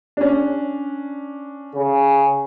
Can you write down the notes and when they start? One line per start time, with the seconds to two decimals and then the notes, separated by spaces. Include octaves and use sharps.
0.17 C#4 D4
1.75 C#3